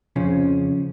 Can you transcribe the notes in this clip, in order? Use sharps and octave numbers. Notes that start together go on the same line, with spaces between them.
F2 C#3 F3 C#4